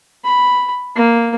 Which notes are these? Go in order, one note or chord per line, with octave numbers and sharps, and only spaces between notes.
B5
A#3